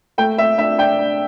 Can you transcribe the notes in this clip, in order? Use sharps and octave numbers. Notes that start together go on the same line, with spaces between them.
A3 G5
A3 E5
D4 E5
D4 G5
D4